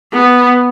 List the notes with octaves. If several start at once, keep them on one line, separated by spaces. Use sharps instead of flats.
B3